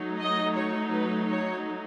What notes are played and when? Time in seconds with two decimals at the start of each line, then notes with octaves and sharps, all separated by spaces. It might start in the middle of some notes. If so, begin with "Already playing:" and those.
Already playing: F#3 A3 D#4
0.19 D#5
0.56 C#5
0.92 B4
1.27 C#5